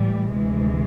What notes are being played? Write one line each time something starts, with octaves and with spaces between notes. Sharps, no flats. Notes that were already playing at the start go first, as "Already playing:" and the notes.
Already playing: A2 E3 G3
D2 C3 E3 G#3